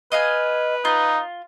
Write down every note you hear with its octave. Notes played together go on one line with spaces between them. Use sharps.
B4 D#5 F5 G#5
D#4 F4